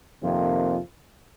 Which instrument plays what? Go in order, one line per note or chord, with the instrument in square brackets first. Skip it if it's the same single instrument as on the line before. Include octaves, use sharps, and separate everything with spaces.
[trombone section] F2 C3 D#3 A#3 F4